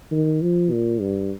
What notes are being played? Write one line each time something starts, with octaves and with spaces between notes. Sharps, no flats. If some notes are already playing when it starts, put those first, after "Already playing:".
D#3
F3
A#2
G2